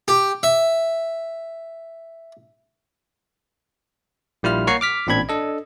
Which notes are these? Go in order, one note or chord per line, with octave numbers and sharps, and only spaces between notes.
G4
E5
A#1 G3 E4 F4 F6
A#3 C#5 F#5 A#5 C#6 C7
D6 F6 B6
A1 A#2 C4 D4 B5 G#6
D4 A4 D#5